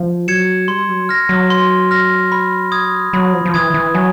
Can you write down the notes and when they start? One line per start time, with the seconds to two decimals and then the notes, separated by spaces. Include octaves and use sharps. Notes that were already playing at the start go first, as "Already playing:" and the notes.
Already playing: F3
0.27 F#3 G#6 C#7 E7
0.68 G3 C6
0.89 F#3
1.09 F6 A#6
1.29 F#3
1.50 C6
1.91 F6 A#6
2.32 B5
2.72 D#6 G#6
3.13 F#3 B5
3.33 F3
3.45 F3
3.54 E3 D#6 G#6
3.74 E3
3.95 F#3 G#5